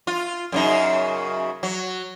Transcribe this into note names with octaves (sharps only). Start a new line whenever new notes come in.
F4
F#2 C#3 D#4
F#3